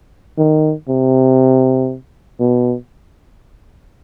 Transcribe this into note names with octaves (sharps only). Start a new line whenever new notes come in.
D#3
C3
B2